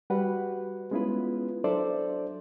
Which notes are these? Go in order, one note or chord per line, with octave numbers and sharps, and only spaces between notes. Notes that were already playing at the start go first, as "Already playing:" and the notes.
G3 F#4 B4 F#5
G#3 B3 C#4 E4 F4 B4
F#3 D4 A4 C5 D5 E5